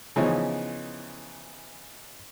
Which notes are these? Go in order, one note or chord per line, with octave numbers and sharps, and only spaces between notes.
C#3 E3 F3 B3 C#4 D#4